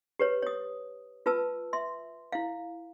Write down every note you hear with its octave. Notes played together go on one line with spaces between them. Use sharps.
G4 B4 C#5
C#5 D#6
F4 B4 A5 E6
E5 C6
E4 F5